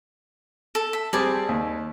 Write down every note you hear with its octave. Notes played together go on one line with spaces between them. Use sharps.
A4
E5
G3 C4 G#4 D5 G#5 A5
D#2